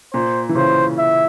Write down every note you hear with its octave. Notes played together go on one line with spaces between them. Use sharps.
A#2 C5
E3
C#3 C5
E5